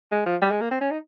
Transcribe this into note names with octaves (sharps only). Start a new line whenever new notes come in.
G#3
F3
G3
G#3
A#3
C4
C#4
D#4